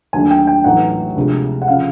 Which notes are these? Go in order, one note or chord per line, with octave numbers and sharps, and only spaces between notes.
D#2 D3 F#3 A3 D4 G#5
G5
G5
A1 A2 F#3 B3 D#4 F#5
D2 C3 F3 G#3
F#5
C#3 F3 F5